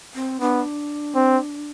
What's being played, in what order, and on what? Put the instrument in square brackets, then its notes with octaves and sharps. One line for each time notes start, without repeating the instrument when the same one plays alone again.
[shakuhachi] C4
[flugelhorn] B3 [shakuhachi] D4
[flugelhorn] C4